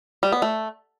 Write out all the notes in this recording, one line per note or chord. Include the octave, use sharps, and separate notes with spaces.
G3
B3
A3